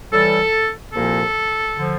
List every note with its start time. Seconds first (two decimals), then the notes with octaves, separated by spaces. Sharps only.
0.12 A2 E3 G3 A4
0.93 C2 A#2 F3 A#3 A4
1.77 D3 F3